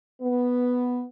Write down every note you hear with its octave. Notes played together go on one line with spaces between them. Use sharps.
B3